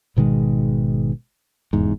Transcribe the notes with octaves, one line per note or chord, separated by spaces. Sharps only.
G#1 B2 D#3 G#3
F1 E2 G#2